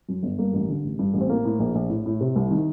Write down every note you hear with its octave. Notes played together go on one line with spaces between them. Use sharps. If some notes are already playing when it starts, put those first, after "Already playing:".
F#2
G1
G2 A#3
A1
D3
A1
G2
A1
C4
A2 A#3
A2
A#1
A#1
A2
A2
C3
C2
D#3